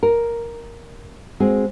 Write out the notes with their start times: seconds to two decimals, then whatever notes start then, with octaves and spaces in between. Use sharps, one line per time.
0.03 A#4
1.40 G#3 C4 F#4 G#4